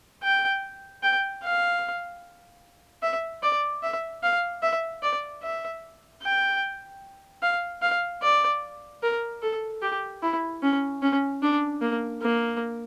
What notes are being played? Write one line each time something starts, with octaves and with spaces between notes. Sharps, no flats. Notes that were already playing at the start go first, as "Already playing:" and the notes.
G5
G5
F5
E5
D5
E5
F5
E5
D5
E5
G5
F5
F5
D5
A#4
A4
G4
E4
C#4
C#4
D4
A#3
A#3